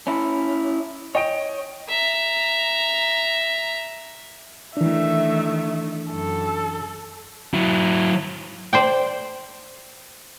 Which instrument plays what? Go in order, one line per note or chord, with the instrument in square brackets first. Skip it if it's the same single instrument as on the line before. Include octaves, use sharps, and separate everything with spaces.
[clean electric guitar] C#4 E4
[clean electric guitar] C#5 [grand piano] D#5 G5 D7
[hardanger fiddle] E5 A#5
[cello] D#3 A3 [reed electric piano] E3 D4 [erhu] E5
[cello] F#2 [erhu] A4
[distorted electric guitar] F#3 E4
[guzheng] C5 D5 G5